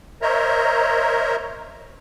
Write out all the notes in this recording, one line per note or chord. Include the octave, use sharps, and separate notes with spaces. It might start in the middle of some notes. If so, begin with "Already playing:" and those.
A#4 C5 C#5 D#5 E5 A#5